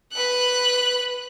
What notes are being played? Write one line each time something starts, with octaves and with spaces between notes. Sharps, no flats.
B4 F#6